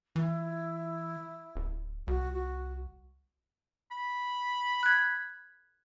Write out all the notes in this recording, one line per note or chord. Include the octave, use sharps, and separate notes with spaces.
E3 E4
D1
C2 F#4
F#4
B5
F#6 G#6